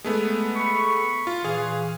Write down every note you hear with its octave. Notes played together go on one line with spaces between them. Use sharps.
G#3 A3 B3
B5 C#6
F4
A#2 E3 G#4 F5